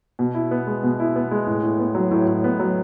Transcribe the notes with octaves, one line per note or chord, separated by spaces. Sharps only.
B2
E4
B3
G#3
B2
E4
B3
G#3
A2
A2
B3
F#3
A2
A2
B3
F#3